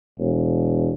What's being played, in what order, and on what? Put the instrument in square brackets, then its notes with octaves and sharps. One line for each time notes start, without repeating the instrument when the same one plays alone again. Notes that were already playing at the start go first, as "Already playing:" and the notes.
[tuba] E1